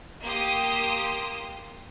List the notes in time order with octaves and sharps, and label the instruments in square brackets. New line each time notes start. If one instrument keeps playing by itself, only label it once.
[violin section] A#3 G4 C6 D#6